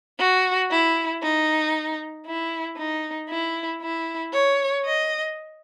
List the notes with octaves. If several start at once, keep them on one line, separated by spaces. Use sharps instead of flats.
F#4
E4
D#4
E4
D#4
E4
E4
C#5
D#5